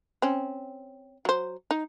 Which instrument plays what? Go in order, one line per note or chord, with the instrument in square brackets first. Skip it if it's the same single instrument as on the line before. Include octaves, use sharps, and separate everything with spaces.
[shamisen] C4 C#4
F#3 C5
D#4